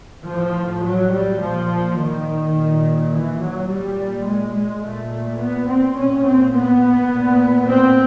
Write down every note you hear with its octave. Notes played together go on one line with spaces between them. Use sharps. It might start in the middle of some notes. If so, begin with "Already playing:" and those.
A2 F3
F#3
G3
A#2 F3
D#3
A#2
E3
F#3
A#2 G3
G#3
G#3
A#2 A3
B3
C4
A#2 C#4
C4
B3
A#2
C4